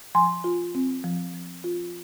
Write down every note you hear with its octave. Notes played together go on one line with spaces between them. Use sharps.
F3 G#5 C6
F4
C4
F3
F3
F4